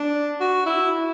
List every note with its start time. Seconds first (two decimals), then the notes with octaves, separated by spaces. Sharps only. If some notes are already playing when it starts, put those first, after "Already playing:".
Already playing: D4
0.40 F#4
0.66 E4